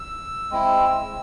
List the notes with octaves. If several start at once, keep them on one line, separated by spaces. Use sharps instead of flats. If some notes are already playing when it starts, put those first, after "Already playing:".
Already playing: E6
G#3 C4 E4